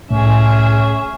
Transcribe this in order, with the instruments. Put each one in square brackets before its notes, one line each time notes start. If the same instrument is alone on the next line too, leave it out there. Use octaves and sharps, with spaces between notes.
[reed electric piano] C2 A2 [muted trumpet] C#4 [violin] G#4 E5